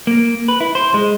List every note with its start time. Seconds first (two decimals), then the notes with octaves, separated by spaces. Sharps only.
0.07 A#3
0.48 B4
0.61 E4
0.75 C5
0.94 G#3